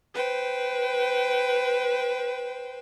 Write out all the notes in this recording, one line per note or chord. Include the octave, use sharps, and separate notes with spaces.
B4 C5 G5